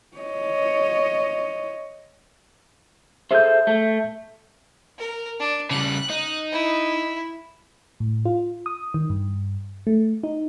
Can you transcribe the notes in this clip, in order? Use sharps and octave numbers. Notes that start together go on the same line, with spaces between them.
C#5 D#5
G#4 A4 C5 E5 G6
A3
A#4
D4
C#3 G3 F#6
D#4
E4
A2
F4
D#6
D#3
G2
A3
D#4